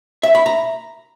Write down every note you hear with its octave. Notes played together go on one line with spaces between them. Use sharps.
E5
B5
A#5